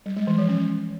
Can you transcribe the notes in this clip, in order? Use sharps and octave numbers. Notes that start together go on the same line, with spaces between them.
G3
G#3
E3
F3
C#4